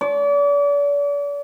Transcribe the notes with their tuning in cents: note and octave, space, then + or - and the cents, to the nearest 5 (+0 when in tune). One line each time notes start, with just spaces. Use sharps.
D5 -40